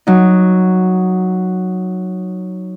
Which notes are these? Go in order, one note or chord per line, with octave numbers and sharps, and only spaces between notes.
F#3 D#4